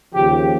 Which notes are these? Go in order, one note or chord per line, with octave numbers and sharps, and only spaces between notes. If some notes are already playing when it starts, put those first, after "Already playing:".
D#2 C#3 F3 G4